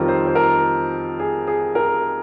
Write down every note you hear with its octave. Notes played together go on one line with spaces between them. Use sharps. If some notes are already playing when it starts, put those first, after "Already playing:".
Already playing: F2 D#3 G3 C4 F4 A#4
C5
C5
A#4
G#4
G#4
A#4